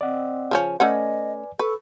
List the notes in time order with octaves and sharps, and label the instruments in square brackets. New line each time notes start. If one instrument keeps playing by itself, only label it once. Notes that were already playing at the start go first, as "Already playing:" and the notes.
[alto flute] C4 [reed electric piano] D5 D#5 F#5
[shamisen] C#3 F3 C#4
[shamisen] A3 C#4 F#5 [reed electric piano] B4 D5 G#5 [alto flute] D#5
[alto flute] A4 [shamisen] B4 [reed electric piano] C#6